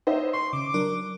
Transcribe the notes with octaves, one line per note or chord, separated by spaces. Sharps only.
D#4 C5 C#5 D#5 E5
C6 C#6
C#3 D6
F#3 D4 A#4